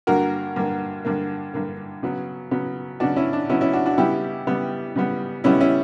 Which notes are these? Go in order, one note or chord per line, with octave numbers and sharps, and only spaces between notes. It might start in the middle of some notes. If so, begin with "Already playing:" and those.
G2 D3 A#3 F#4 A#4
G2 D3 A#3
G2 D3 A#3
G2 D3 A#3
C#3 F#3 B3
C#3 F#3 B3
C#3 F#3 B3 D4 F#4
C#4 E4
D4
C#3 F#3 B3 C#4 E4
C#4 E4
D4 F#4
D4 F#4
C#3 G3 B3 E4 G4
C#3 G3 B3
C#3 G3 B3
C#3 G3 B3 C#4 E4
C#4 E4